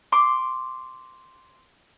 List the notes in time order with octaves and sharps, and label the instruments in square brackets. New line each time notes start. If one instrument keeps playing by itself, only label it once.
[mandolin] C6 D6